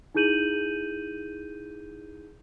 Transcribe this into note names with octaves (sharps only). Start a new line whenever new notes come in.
D#4 E4 G#4 G6 D#7 F#7